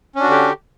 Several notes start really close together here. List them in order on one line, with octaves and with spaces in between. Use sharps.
C#4 D4 F#4 D3 G4